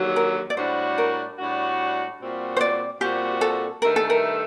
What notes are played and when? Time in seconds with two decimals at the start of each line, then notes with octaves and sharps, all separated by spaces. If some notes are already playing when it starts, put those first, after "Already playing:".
Already playing: D#2 D3 F#3
0.16 A#4
0.50 D5
0.57 A2 G3 D4 F#4 C5
0.98 A#4
1.39 A2 G3 D4 F#4
2.19 A#2 G3 C4 F#4
2.57 C5
2.61 D5
3.01 A#2 G3 C4 F#4 G4
3.41 A4
3.82 G2 D#3 A3 A#4
3.96 A4
4.10 A#4